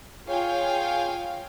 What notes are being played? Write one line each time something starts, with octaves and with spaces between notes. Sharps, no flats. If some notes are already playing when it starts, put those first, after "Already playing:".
F4 G#4 C#5 F5 G5 G#5